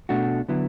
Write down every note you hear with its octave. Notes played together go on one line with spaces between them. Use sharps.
B2 A3 D4 F#4
D3 F#3 B3 E4